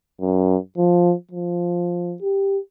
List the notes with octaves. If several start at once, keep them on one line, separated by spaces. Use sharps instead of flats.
F#2
F3
F3
G4